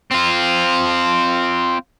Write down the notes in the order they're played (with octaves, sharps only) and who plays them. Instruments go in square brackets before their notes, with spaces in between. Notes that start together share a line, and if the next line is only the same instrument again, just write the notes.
[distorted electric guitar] C4 F4